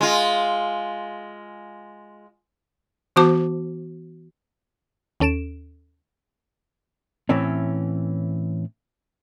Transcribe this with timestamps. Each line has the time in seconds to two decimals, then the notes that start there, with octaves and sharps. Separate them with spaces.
0.01 G#3 F4
3.16 E3 B3 F#4 C5 A5 D6
5.20 D#2 C#4 A4 D7 E7
7.29 A2 E3 C4 C#4